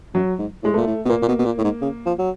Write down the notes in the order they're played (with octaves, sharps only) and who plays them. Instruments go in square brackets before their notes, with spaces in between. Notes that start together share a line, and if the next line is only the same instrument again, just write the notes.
[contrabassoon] F#2 [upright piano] F#3
[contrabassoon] G#2
[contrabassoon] A2 [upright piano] G#3
[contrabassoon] A#2 [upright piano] A3
[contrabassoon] A2
B2
[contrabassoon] A#2 [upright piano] A#3
[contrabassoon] A#2
B2
B2
A#2
A2
G#2
C#3
F3
F#3